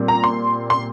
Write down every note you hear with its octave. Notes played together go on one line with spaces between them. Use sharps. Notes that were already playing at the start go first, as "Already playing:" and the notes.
Already playing: A#2 G3 C4
A#5
C6
C6